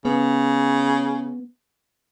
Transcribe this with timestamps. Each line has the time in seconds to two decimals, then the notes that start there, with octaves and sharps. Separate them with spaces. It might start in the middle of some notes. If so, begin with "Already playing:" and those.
0.05 C#3 B3